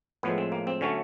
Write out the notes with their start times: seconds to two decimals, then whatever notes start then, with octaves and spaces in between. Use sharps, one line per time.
0.23 A2 F3 G#3 B3
0.38 C4
0.52 A#3
0.67 C4
0.81 D3 F#3 A3 C#4